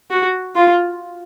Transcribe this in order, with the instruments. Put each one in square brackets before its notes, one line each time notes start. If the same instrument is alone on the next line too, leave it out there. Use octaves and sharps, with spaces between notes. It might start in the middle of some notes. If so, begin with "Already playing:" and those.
[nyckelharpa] F#4
F4